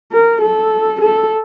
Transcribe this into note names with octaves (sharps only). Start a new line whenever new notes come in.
A#4
A4
A4